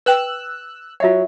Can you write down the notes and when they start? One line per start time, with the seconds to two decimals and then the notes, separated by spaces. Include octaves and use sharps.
0.06 B4 G5 E6 F#6
1.00 F#3 F4 C#5 E5 F#5